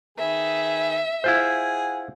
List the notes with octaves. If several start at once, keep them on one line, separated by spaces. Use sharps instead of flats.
D#3 G#4 B4 E5
E4 F4 G#4 C5 F#5